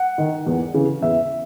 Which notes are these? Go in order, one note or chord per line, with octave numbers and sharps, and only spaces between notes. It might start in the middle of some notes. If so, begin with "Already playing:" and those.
Already playing: F#5
D#3
E2
C#3 E3
E2 E5